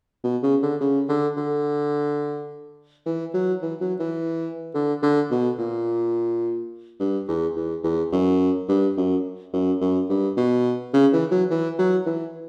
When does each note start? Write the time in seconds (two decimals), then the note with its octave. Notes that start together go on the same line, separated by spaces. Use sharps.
0.24 B2
0.43 C#3
0.62 D3
0.81 C#3
1.09 D3
1.37 D3
3.06 E3
3.34 F#3
3.62 E3
3.81 F#3
3.99 E3
4.75 D3
5.03 D3
5.31 B2
5.59 A#2
7.00 G2
7.28 E2
7.56 E2
7.84 E2
8.12 F#2
8.69 G2
8.97 F#2
9.53 F#2
9.81 F#2
10.10 G2
10.37 B2
10.94 C#3
11.13 E3
11.31 F#3
11.50 E3
11.79 F#3
12.06 E3